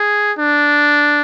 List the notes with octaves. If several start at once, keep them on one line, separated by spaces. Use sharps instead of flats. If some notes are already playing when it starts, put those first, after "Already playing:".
Already playing: G#4
D4